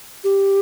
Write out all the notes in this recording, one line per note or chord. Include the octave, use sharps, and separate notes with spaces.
G4